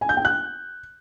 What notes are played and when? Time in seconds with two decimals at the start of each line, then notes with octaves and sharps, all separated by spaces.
0.01 G#5
0.09 G6
0.17 G5
0.25 F#6